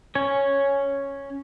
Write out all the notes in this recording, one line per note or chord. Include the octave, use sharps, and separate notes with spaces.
C#4 C#5